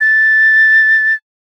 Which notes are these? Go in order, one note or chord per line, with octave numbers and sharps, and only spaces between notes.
A6